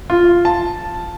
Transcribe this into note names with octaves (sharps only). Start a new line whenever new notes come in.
F4
A5